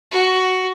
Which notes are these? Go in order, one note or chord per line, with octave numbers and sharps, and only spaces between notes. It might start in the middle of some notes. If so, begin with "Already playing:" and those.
F#4